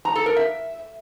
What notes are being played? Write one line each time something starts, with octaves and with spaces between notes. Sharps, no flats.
A#5
A4
A#4
E5